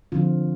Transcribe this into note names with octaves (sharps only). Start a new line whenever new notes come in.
D3 F3 C4 F4